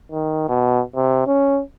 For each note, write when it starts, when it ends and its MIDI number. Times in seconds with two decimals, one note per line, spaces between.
0.12 0.48 51
0.48 0.81 47
0.95 1.22 48
1.27 1.61 61